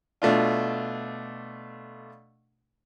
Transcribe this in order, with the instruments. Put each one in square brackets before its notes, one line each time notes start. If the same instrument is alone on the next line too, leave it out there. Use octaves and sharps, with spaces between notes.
[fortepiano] B2 A3 D4 F4